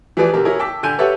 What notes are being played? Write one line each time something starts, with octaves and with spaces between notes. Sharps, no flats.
E3 F3 G4 G#4 B4 D5
B2 D3 G4 A#4
E4 G#4 A#4 C#5
G5 A5 D6 E6 B6
D3 G#5 G6 D#7
G4 A4 B4 C#5 E5 F#5